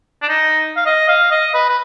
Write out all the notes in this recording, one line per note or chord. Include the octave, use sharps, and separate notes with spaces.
D4
D#4
F5
D#5
F5
D#5
B4
B4